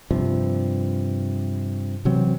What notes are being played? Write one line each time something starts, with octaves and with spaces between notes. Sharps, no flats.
G2 C3 F3
C3 E3 F#3 C4